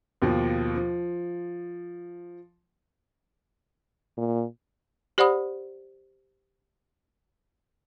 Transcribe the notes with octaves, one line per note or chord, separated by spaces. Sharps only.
D#2 B2 F3
F3
A#2
G4 C5 D5 F#5 B5 D#6